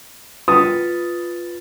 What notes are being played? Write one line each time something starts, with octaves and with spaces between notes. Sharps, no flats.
F4 B4 D#6 A6